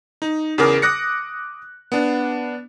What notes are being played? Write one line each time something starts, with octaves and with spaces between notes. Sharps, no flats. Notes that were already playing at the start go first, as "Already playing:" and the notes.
D#4
E2 C#3 G#4 A#4 D6
D6 D#6 F#6 A#6 C#7
B3 D4